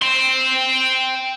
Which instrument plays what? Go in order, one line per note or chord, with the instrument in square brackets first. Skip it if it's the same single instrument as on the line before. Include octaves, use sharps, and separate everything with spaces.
[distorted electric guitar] G5 C6